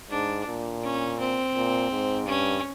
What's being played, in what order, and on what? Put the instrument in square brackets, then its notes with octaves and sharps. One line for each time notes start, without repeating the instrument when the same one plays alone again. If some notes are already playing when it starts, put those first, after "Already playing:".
[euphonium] G#2 [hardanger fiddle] D4
[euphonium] A#2
[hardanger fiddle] C#4
C4
[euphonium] A#2
G#2
[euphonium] G2 [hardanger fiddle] C#4